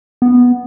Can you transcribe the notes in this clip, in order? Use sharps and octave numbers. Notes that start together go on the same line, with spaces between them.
B3